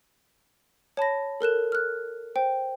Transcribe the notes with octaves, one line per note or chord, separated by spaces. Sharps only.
C#5 A5 B5 A#6
A4 A#4 F#6 E7
F6 F#6
C5 G5